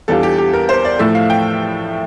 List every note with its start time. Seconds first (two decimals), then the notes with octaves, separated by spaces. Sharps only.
0.08 E2 E3 G3 D4 F4 A4
0.23 G4
0.38 G4
0.53 A#4
0.69 C5
0.85 D5
0.99 A2 F3 A3 E4 E5
1.15 F5
1.30 G5